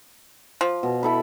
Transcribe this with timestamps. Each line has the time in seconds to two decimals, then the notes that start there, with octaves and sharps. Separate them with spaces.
0.61 F3
0.83 B2
1.03 E4 A4 B5